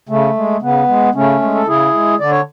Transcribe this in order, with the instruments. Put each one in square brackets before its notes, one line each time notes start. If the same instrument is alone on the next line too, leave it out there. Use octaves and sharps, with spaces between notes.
[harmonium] C#3 A3
G#3
C#3 B3
G#3
C#3 A3 C#4
G#3
A4
C#3 E4 G#4
G#3
D3 D5
C#5